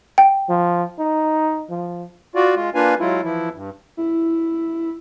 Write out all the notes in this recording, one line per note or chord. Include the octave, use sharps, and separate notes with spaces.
G5
F3
D#4
F3
F4 F#4 D5
G#3 F4
A#3 D4 F4 B4 F5 G#5
F#3 G#3 E4 F4
E3 F3 E4
G2
E4